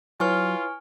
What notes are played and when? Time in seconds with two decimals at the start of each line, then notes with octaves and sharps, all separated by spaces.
0.20 F#3 E4 F4 B4 C#5 G#5 C#6 F6